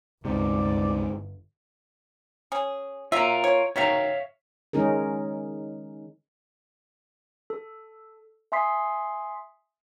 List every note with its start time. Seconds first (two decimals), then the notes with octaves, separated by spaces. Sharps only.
0.25 G1 C#2 G#2 C3 D5
2.52 C#4 G#4
3.12 F#3 F4 A#4 E5
3.44 C#5
3.76 D#3 F#4 A#4 C#5 E5 F5
4.73 D#3 G#3 C#4 D#4 G#4 A#4
7.50 A4
8.52 E5 G#5 C6 D#6 B6 C7